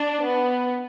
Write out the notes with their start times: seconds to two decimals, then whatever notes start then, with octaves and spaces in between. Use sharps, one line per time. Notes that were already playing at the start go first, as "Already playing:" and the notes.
Already playing: D4
0.24 B3